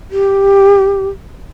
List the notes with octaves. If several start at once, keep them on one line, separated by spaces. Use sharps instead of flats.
G4